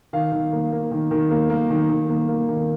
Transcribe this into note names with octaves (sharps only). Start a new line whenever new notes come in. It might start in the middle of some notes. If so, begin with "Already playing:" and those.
D#3 F5
D#3
A#3
A#3
D#3
D#3
A#3
A#3
D#3
D#3
A#3
A#3
D#3